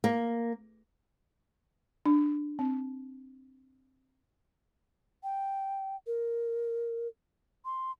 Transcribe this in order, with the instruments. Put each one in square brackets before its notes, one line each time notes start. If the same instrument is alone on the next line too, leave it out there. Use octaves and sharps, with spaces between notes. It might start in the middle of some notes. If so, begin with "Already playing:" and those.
[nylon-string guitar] A#3
[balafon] D4
C4
[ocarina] G5
A#4
C6